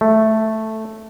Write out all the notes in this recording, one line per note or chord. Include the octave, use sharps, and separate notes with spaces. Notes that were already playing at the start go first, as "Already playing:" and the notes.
A3